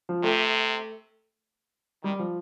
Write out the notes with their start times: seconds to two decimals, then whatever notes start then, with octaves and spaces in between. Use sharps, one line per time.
0.09 F3
0.23 C3 A3
2.04 D#3 G3
2.19 F3